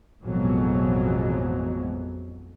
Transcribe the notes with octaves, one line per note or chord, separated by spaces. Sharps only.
A1 F2 B2 E3 F#3 G#3